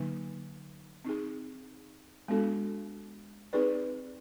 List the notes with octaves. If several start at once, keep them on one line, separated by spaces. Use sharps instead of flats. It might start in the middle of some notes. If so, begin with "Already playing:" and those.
Already playing: D3 F#3 A#3 D#4
C4 D#4 G#4
G#3 B3 D4 F#4 A4
C4 D#4 G#4 B4 D5